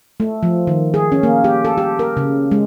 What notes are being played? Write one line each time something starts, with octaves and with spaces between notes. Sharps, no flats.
A3
F3
D#3
G#4
C#4
A#3
G4
A4
G4
A#4
C#3
G#3